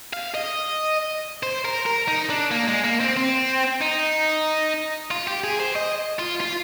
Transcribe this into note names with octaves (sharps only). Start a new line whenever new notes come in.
F5
D#5
C5
A#4
A#4
D#4
D4
A#3
G#3
A#3
C4
C4
D#4
F4
G4
G#4
C5
D#5
F4
F4